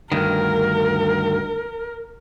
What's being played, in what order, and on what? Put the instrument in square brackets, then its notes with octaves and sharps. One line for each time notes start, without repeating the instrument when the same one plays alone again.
[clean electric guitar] D2 G2 D#3 [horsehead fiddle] A#4